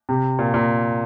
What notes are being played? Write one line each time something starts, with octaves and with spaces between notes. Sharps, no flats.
C3
A#2
A#2